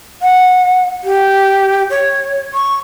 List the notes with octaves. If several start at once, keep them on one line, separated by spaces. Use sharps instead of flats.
F#5
G4
C#5
C#6